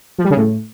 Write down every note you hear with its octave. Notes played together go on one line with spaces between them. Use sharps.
F3
G3
C#3
A2